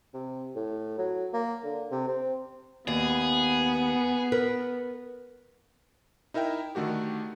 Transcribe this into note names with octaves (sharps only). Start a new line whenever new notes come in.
C3
A2
F#3
A#3
D3
C3
C4
D#2 B3 G#4
A#4 B4
D#4 E4 A#4 E5 G5
D3 D#3 A3 F#4 G4